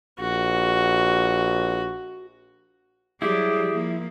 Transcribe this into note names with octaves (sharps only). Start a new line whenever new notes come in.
A#1 F#4
F#3 G3 E4 G4 G#4
F3 A#3